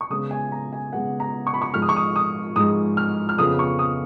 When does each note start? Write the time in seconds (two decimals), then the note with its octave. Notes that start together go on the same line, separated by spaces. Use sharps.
0.01 C#6
0.10 C#3 G#3 B3 D#6
0.31 G#5
0.52 A#5
0.72 G#5
0.93 C#3 G#3 B3 F#5
1.20 A#5
1.47 C#6
1.54 B5
1.62 C#6
1.74 G#2 F3 G#3 F6
1.82 D#6
1.89 C#6
1.96 D#6
2.16 D#6
2.56 G#2 F3 G#3 D#6
2.97 F6
3.29 F6
3.38 F2 C#3 G#3 B3 D#6
3.59 C#6
3.79 D#6